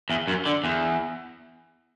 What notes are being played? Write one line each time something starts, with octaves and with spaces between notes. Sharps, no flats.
E2
F#2
D3
E2